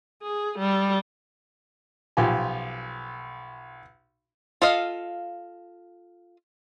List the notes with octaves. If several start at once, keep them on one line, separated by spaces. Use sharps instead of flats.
G#4
G3
B1 F3 F4 G4 G#5
F4 A4 D#5 F5